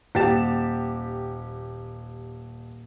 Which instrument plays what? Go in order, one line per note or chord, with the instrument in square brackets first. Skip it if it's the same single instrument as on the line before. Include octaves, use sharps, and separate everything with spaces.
[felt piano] D#1 G4 A6 E7